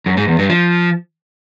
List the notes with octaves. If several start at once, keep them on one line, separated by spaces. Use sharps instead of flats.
F#2
G#2
E2
G2
F3